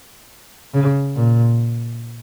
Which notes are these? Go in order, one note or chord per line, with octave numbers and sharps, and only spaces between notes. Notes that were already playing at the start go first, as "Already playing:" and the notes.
C#3
A#2